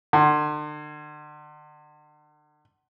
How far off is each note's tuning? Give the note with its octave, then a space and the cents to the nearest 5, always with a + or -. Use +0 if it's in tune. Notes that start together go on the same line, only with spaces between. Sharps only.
D3 +40